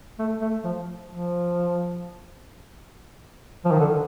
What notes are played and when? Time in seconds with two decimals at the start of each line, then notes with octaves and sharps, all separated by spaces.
0.19 A3
0.41 A3
0.64 F3
1.09 F3
3.65 F3
3.71 D#3
3.79 D3